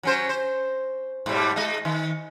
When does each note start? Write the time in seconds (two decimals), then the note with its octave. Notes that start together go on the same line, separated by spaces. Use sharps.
0.03 F#3 C#4 C5
0.29 C5
1.26 G#2 B2 G3
1.56 G#3 D#5
1.85 D#3